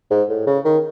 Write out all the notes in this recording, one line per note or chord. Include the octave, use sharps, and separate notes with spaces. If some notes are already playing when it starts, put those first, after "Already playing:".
G#2
A2
C#3
D#3